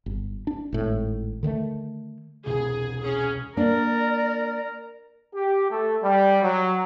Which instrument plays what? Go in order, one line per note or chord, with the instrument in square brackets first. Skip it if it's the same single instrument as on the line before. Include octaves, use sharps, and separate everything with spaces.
[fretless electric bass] G1
D4
G#1 A2
D3 D#3 G#3 A3
[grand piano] E1 C2 [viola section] G#4
[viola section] C#4 G#4
[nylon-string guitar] A#3 D4 [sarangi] A#4 [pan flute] D5
[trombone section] G4
A3
G3
F#3